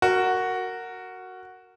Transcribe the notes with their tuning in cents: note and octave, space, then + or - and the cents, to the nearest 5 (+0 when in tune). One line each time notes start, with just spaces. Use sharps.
F#4 +0 A#4 -15